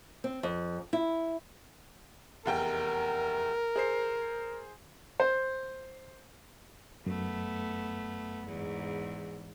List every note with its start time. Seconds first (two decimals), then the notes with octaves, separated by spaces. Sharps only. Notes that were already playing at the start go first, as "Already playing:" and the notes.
0.24 C4
0.43 F2
0.93 E4
2.46 F1 E2 A#4 G5
3.76 G#4 C5 C7
5.20 C5
7.06 F#2 A3 B3
8.47 E2 G#2